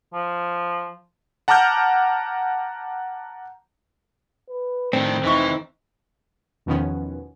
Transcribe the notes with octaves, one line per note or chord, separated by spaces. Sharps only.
F3
F#5 A5 A#5 D6 F6 G6
B4
A2 D#3 C4 D4
F1 E3 D#4 C#6
E2 B2 D#3 F3 B3 C#4